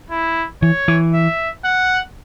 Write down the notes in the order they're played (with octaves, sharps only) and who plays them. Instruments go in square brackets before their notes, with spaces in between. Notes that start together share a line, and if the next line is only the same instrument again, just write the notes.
[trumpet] E4
[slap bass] E3 [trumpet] C#5
[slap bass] E3
[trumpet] E5
F#5